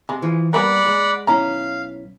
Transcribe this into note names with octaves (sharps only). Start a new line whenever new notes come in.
C3 G#3
E3 F3
G3 A#3 B3 A#4 D5 F#5 B5
G#3
B1 C#4 E4 F5 A#5